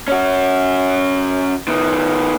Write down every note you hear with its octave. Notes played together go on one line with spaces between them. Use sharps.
C#4 F#4
D#3 B3